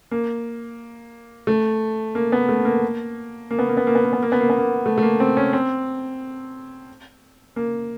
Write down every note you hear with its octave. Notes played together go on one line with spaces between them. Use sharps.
A#3
A3
A#3
B3
A3
A#3
A#3
B3
A#3
B3
A#3
B3
A#3
B3
A#3
B3
A#3
B3
A#3
A3
A3
A#3
C4
C#4
C4
A#3